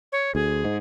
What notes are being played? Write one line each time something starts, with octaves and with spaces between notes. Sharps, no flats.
C#5
D2 G#4
G#2